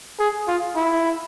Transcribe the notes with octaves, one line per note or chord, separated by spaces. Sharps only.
G#4
F4
E4